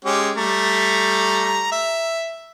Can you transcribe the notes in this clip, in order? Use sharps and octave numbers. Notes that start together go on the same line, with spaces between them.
G#3 C#4 G4
G3 A3 A#5
E5